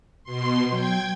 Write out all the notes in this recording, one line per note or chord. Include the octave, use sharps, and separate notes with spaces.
B2 C6
F#3 G5 G#6